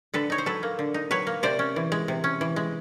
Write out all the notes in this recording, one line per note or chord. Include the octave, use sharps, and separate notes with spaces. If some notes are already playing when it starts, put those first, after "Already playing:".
D3 A4 B4
D#4 C#5
C5
F#3 A4 B4
A#3
D3
D#4
F#3 B4 C#5
A#3
C3 C5 D5
C#4
E3
G#3
C3
C#4
E3
G#3